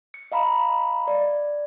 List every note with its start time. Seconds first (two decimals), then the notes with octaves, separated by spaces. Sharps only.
0.14 C#7
0.32 D#5 F5 A#5 B5
1.08 D5